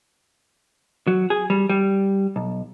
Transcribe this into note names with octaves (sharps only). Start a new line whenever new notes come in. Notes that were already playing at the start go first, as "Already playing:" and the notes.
F#3
G#4
G3
G3
B1